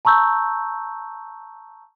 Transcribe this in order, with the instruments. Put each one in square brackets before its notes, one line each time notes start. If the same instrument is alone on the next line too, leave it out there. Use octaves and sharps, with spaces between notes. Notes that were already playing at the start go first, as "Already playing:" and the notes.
[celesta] A5 A#5 C#6 E6 G6